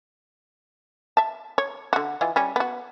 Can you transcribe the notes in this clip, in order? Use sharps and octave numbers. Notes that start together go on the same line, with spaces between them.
E5 A5
C#5
D3 F#4
E3 F4 D#5
G3 C#4
B3 F#4